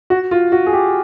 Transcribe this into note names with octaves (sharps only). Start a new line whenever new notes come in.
F#4
F4
F#4
G#4
G4